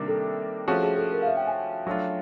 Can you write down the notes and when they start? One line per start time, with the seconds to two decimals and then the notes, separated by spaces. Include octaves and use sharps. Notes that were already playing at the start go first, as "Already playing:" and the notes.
Already playing: C3 D#3 G3 A#3 D4
0.08 A4
0.68 F3 A3 C#4 F#4 G#4
0.83 G#4
0.97 A4
1.12 A#4
1.22 F5
1.27 E5
1.37 G5
1.47 G#5
1.87 F#3 A3 D4 F4